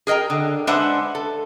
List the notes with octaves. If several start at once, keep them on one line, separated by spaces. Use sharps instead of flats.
G#4 A#4 D#5 G5 A#5
D3
G#3 D4 B4 C5 E5 F#5
A4